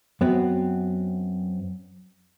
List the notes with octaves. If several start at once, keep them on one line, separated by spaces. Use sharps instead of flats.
F#2 B3 C4